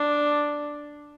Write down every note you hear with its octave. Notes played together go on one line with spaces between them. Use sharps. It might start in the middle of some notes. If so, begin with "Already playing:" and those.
Already playing: D4